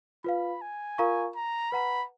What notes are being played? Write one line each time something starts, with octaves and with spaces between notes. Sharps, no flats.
F4 B4 F5 B5
G#5
F4 A#4 F5 A#5 C#6
A#5
B4 F#5 A#5 B5